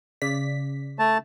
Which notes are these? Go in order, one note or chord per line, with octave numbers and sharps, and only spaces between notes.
C#3 D5 B6
A3 A5